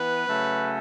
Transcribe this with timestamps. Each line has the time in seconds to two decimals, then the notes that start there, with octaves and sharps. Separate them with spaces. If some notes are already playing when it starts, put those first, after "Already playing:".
Already playing: E3 B3 B4
0.26 C#3 F#3 A3 C#4